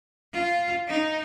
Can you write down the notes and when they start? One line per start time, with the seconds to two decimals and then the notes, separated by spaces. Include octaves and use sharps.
0.33 F4
0.88 D#4